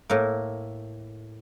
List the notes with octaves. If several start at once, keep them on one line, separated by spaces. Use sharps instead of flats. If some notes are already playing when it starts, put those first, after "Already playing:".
A2 A#3